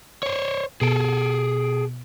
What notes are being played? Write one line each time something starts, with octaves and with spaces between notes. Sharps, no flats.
C5 C#5
B2 G#4 A4 D7